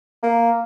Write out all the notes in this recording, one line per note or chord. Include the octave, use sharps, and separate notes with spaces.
A#3